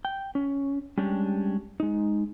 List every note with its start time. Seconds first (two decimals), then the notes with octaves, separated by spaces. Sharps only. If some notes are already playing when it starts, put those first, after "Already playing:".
0.05 G5
0.35 C#4
0.97 G3 G#3 C#4 D4 G4
1.80 G#3 D#4